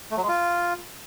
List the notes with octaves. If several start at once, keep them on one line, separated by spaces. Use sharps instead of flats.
A3
F#3
G#3
F4